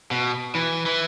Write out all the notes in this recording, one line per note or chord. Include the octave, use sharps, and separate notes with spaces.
B2
E3
E3